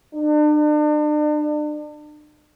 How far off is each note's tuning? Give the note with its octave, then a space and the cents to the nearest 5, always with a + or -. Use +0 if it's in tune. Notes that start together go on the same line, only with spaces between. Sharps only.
D4 +40